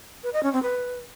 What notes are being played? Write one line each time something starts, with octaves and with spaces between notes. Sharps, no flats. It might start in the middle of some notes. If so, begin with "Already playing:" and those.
B4
D#5
C#4
C4
B4